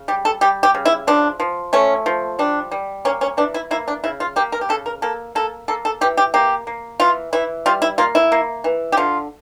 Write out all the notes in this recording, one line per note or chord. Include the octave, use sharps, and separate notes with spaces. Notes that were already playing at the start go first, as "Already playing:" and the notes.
Already playing: C#3
G3 G4
A4
G3 G4
G4
C#3
E4
F3 D4
F3
A3 C#4
F3
G3 D4
G3
A#3 C#4
C#4
E3 D4
E4
A#3 E4
D4
C#3 E4
F4
A#3 G4
A#4
G4
C#3 A4
A#4
A#3 A4
A#3 A4
A#3 A4
A4
E3 G4
G4
A#3 G4
A#3
E3 F4
E3 E4
G3 F4
E4
A#3 F4
E4
A#3
E3
G4
D3 F4